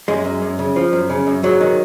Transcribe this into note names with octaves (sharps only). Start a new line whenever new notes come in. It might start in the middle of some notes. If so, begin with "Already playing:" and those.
F#2 G#3
F#2
F#2
C#3
F3
F#2
C#3
F#2
G#2 F#3
D#3